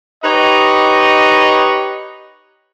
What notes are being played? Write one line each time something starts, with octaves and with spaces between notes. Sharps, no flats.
D#4 G4 B4 C#5 D#5